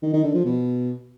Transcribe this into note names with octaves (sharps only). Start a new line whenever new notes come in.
D#3
D#3
D3
F3
B2